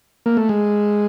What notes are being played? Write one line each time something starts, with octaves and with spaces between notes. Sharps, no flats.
A#3
A3
G#3